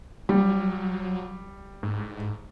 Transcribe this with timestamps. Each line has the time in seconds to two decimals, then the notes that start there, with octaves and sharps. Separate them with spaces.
0.29 F#3 G3
1.83 G#2